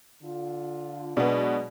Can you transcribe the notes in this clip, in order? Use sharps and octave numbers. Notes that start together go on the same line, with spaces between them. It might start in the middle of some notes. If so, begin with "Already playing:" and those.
D3 F4
B2 F#3 G#3 B3 D4 D5